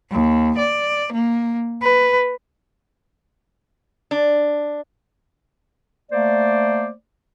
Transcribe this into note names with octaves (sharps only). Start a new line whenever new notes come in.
D#2
D5
A#3
B4
D4
A3 A#3 C5 D5